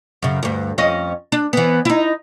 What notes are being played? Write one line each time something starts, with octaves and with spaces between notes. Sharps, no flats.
F#2 C#3
D2 G2
F2 C#4 D#5
D4
E3 B3
D#4 E4